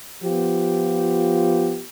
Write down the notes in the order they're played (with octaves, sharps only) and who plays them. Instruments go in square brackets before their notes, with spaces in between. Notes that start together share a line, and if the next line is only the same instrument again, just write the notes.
[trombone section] F3 B3 F4 G4